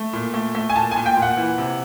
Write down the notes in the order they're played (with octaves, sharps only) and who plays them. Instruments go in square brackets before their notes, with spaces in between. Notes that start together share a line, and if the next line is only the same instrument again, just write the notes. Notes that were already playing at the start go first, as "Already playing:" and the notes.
Already playing: [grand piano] A3
A#2
A3
A3
G#5
A#2 A5
A#2 G#5
G5
A#2
F#5
E3
C3